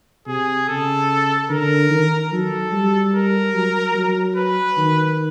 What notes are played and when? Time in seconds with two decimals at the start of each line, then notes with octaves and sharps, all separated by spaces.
0.27 C3 G#4
0.69 C#3 A4
1.50 D3 A#4
1.90 D#3
2.32 F#3 A4
2.72 G3
3.14 A#4
3.55 F#3
3.95 F#3
4.36 B4
4.77 D#3